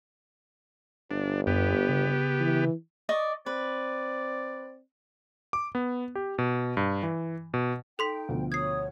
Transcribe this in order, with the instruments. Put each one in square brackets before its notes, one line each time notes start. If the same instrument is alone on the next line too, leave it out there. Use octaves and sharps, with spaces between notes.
[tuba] G1 [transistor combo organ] D4
[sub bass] F#2 [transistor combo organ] B3 G4
[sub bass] C#3
[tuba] E3
[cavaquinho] D5 D#5 C#6
[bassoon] C4 [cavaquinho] B4 [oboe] D5
[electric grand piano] D6
B3
G4
B2
G2
E3
B2
[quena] D#4 [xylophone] A4 C6 B6 [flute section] G5
[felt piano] D2 B2 F3
[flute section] C#5 [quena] D#6 [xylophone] G#6 C7